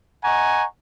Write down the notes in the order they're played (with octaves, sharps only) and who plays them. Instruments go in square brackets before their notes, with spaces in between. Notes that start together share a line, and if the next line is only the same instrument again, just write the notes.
[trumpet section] D#5 F#5 G#5 A#5 C#6